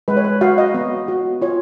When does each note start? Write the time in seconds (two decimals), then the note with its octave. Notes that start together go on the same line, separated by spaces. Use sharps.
0.08 G#3 B4
0.17 C#5
0.24 B4
0.41 F#4 F5
0.58 D#5
0.74 B3
1.08 F#4
1.42 F4 C#5